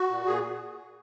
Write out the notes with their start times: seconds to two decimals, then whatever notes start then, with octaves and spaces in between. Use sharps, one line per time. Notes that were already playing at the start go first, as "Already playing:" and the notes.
Already playing: F#4
0.09 A#2
0.26 A#2 G#4